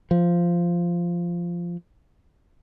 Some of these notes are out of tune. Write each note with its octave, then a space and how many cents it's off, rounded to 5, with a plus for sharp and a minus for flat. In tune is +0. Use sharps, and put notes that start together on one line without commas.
F3 -10